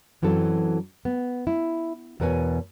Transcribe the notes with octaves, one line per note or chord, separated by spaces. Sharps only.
F#2 E3 F#3 C4 A4
B3
E4
E2 B2 A#4 B4 C#5 G#5